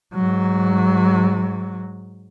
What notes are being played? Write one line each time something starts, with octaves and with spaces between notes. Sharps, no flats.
G#2 F#3